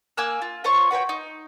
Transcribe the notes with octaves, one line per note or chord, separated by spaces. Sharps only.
A#3 G#5 E6 F#6
F4
F4 C5 C#5 C#6
F#4 B4 C#5 G5
D#4